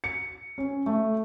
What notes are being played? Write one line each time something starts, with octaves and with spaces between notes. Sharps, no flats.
C#7
C#4
A3